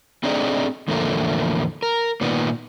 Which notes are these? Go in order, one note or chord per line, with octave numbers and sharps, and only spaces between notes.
A3 C4 D4 D#4 G#4 D5
E2 A2 D3 F3 A3 A#3
A#4
A#2 D#3 B3